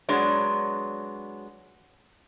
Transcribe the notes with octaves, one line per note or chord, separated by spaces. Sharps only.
F#3 G#3 B3 D4 C#5